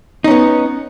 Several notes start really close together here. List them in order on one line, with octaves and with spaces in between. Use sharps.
D#4 C#4 B3